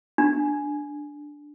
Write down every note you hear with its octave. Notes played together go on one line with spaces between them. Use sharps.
D4